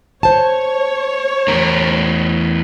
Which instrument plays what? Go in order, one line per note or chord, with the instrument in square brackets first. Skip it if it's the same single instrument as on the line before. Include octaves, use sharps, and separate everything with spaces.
[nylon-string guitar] C5 A5 [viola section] C#5
[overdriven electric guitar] E2 A#4